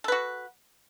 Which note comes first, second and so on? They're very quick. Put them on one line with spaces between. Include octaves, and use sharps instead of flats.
A4 B4 F#4